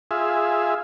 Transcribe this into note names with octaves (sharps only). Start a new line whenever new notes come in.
F4 G#4 E5